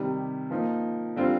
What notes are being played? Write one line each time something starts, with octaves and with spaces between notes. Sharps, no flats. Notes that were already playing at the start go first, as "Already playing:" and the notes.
Already playing: C3 D#3 G3
F3 A#3 D#4
D3 G3 C4 F4